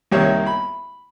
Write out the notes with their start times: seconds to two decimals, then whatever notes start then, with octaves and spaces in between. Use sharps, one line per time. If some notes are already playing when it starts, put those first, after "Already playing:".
0.12 C2 C3 D#3 A#3 C#5 E5
0.46 B5